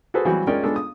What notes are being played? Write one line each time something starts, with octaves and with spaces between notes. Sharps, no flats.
F#4 G#4 A4 B4 C5
E3 F#3 G3 C4 F#4
G#3 C#4 F4 A#4 D5 G5
G#3 B3 D4 F4 A4
D#6